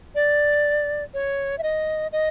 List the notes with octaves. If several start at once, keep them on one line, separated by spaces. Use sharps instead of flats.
D5
C#5
E5
D#5
D#5